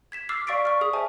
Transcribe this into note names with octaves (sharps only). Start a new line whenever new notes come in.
G#6 B6 E7
D6 E6 F6 A6 C7
D5 F5 C#6 A6 B6 D7
C#6 F6
G#4 D#6
C5 E5 G#5 A5